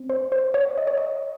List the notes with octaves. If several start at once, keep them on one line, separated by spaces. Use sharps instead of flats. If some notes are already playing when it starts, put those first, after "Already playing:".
Already playing: C4
C5
C5
C#5
D#5
C#5
D#5